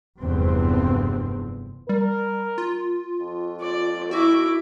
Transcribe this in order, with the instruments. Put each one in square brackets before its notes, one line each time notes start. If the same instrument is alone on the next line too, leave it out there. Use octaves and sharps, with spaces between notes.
[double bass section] F1 E2 G2 C4
[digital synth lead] G3 [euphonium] A#4
[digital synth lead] F4
[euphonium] F2
[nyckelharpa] D5
[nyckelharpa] E4 D6 [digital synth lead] F#4